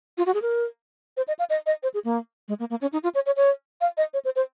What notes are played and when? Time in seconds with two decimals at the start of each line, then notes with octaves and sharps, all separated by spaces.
0.18 F4
0.26 F#4
0.34 G#4
0.42 A#4
1.17 C5
1.28 D#5
1.39 F5
1.50 D#5
1.66 D#5
1.83 C5
1.94 G#4
2.05 A#3
2.48 G#3
2.60 A#3
2.70 A#3
2.81 C#4
2.93 D#4
3.03 F4
3.15 C#5
3.26 C#5
3.37 C#5
3.81 F5
3.98 D#5
4.14 C#5
4.25 C5
4.36 C5